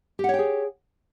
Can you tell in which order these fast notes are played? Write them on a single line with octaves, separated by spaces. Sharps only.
G4 F#5 C#5 G5 G#4